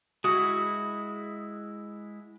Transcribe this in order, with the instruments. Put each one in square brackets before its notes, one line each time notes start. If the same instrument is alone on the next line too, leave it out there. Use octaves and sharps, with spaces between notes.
[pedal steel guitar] G#3 E4 [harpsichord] F#4 [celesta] D#6